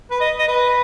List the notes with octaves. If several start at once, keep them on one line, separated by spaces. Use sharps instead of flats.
B4
D#5
D#5
B4